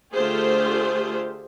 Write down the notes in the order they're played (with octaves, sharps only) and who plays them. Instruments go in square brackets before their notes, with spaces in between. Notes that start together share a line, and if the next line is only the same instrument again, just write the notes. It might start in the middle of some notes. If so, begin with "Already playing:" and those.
[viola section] D3 A3 F4 G4 G#4 C5